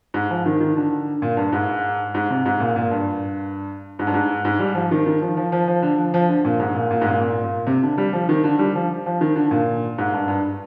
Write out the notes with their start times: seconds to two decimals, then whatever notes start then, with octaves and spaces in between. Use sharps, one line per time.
0.14 G#2
0.31 F3
0.46 D#3
0.60 D#3
0.77 D3
1.22 A#2
1.37 G2
1.52 G#2
2.14 G#2
2.30 C3
2.45 G#2
2.60 A#2
2.76 A#2
2.91 G2
3.99 G#2
4.07 G2
4.14 G#2
4.45 G#2
4.59 G3
4.75 F3
4.91 D#3
5.06 D#3
5.22 F3
5.37 F3
5.52 F3
5.68 F3
5.82 D3
5.98 F3
6.14 F3
6.29 D3
6.45 A#2
6.60 G#2
6.75 A#2
6.91 A#2
7.01 G#2
7.06 A#2
7.21 A#2
7.44 A#2
7.67 C3
7.83 D3
7.98 G3
8.13 F3
8.29 D#3
8.44 D3
8.59 G3
8.75 F3
9.06 F3
9.21 D#3
9.36 D3
9.51 A#2
9.98 G#2
10.13 G2
10.28 G2